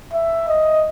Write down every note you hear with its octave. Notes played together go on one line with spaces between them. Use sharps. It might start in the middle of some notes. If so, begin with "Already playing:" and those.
E5
D#5